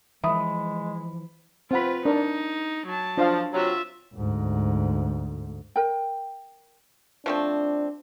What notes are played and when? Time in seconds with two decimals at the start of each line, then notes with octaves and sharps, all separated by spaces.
0.24 E3 F3 G#3 E5 B5 D#6
1.71 C4 F4 B4 F#5 B5
2.05 D4 D#4 A#4
2.87 F#3 A5
3.17 F3 D4 F5
3.53 C3 F#3 F4 E5
4.14 D2 G#2
5.76 A#4 G5
7.26 F3 A3 C4 D4